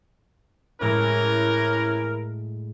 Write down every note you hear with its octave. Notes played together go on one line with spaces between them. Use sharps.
A2 E3 G#3 C#4 E4 A#4